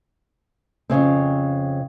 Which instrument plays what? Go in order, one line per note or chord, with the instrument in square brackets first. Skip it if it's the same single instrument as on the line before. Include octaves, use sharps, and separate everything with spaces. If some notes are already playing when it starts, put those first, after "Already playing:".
[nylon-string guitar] F2 A2 C#3 C4